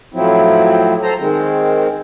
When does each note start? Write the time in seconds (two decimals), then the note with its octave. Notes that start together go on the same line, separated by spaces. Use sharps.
0.14 A2 F3 F#3 C4 E4
1.02 A4 C5 A#5
1.19 D#3 G#3 C4